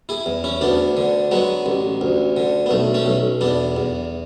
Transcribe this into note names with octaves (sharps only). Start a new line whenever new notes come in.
E4 G#4
E2
C#4 E4
D2 B3 D4
D3
F#3 G#3 B3
A1
D2
D3
B3
B1 A3
A3 C#4
B1
E2 B3 D4
E2